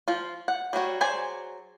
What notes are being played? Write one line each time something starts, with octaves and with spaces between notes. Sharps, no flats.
F3 F4
F#5
F#3 G3 F#4 C#5
F#3 G#4 C5 D5 G#5